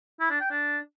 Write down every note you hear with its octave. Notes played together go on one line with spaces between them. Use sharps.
E4
D4
G5
D4